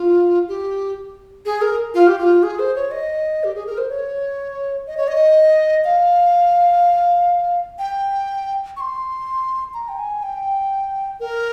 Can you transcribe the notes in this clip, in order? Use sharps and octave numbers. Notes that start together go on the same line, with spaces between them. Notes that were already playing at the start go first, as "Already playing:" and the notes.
Already playing: F4
G4
G#4
A#4
F4
G4
F4
G#4
C5
C#5
D#5
G4
G#4
A#4
C5
C#5
D#5
C#5
D#5
F5
G5
C#6
C6
A#5
G5
G#5
G5
A#4